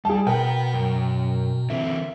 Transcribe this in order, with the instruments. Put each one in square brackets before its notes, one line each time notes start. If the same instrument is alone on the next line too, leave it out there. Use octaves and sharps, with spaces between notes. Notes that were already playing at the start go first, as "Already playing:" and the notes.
[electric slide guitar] G3 [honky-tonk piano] G#4 A5
[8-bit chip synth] B2 [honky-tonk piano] A#4 G5 [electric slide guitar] B4 F#5
[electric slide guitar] F#2
[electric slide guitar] D3 E3 C4 [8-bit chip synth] E5